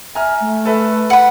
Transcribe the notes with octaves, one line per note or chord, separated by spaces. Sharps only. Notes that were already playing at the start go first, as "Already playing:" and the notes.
E5 G#5 A#5 F6
A3
A4 B4 E5
F#5 B5 C#7